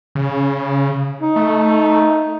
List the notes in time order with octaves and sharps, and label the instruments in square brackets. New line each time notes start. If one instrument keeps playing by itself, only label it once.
[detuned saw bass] C#3
[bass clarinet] D#4
[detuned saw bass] A3